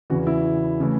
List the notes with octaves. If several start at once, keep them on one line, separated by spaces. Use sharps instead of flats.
E2 C#3 E3 F#4
E4
C#3 E3 A3